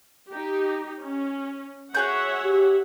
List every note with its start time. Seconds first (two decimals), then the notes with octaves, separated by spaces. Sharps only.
0.30 D#4 G4
1.00 C#4
1.95 F#4 G#4 C#5 E5 F#5 G6
2.44 G4